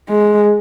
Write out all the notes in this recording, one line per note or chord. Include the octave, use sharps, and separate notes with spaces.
G#3